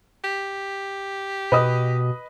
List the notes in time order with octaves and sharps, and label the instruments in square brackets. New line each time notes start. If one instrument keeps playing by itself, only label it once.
[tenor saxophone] G4
[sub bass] B2 [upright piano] B4 D#5 D#6